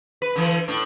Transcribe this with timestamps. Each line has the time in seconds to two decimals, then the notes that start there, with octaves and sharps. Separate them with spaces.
0.22 B4
0.36 D3 E3
0.68 A2 D4